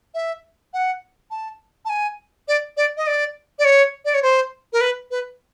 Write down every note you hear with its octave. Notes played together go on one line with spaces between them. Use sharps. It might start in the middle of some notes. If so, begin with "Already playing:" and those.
E5
F#5
A5
A5
G#5
D5
D5
D#5
D5
D5
C#5
D5
C#5
C5
A#4
B4
B4